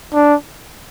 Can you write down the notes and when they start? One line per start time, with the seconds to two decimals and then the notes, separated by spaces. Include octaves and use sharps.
0.14 D4